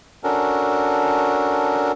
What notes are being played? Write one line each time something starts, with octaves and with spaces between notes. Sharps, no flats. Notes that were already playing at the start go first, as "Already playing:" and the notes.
C#4 D4 F#4 A4 A#4